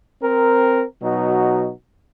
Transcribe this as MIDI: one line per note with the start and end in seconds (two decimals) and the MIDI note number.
0.22 0.84 60
0.22 0.84 70
1.02 1.71 47
1.02 1.71 54
1.02 1.71 63
1.02 1.71 66